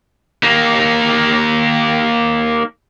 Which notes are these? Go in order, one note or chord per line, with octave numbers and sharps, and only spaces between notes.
A#3 D#4